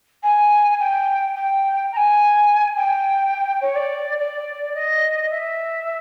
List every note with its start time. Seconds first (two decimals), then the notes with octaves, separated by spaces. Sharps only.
0.23 G#5
0.79 G5
1.35 G5
1.92 A#5
1.96 G#5
2.76 G5
3.61 C#5
3.75 D5
4.18 D5
4.74 D#5
5.30 E5